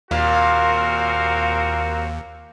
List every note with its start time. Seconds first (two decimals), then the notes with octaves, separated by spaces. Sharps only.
0.11 D#2 A#2 C4 F#4 A#4 F5